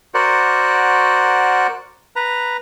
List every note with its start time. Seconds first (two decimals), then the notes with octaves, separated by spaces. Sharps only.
0.14 F#4 A#4 C5 D5 F#5
2.16 B4 A#5